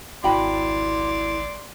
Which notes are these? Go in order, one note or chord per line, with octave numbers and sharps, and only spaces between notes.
G#1 C#2 E4 F#4 D5 G5 B5 C6